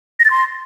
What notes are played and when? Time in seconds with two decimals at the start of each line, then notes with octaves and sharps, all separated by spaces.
0.19 A#6
0.25 A6
0.31 C6